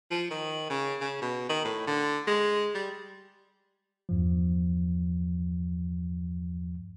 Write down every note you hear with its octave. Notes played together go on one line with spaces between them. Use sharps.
F3
D#3
C#3
C#3
B2
D#3
A2
D3
G#3
G3
E2 G2 F3